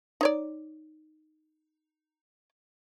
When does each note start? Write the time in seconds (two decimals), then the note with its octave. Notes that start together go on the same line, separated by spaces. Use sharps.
0.21 D#4 C#5 D5